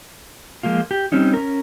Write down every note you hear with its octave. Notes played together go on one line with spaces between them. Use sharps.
F3 G#3 A#3 F4
G4
G3 C4 C#4 D#4
C#4 A#4